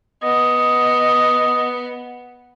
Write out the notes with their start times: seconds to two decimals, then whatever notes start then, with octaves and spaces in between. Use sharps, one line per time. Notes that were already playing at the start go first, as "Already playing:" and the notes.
0.23 B3 D#5